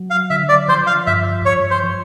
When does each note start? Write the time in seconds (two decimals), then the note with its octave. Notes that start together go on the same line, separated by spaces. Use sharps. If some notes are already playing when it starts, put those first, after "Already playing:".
Already playing: F#3
0.10 F5
0.30 D3 E5
0.49 D5
0.68 F3 C5
0.87 F5
1.07 G2 E5
1.45 G2 C#5
1.71 C5
1.83 F3